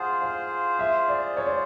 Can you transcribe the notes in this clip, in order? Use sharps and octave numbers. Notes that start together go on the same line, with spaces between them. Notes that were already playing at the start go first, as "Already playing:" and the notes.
Already playing: F4 G#4 C5 F#5
F5
E5
D5
C#5
D5